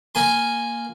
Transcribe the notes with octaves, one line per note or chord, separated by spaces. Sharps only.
A#3 G#5 C6